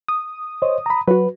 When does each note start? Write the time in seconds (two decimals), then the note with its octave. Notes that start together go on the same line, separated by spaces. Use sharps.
0.08 D#6
0.62 C5 C#5 D#5
0.86 A#5 B5
1.08 F#3 F#4 B4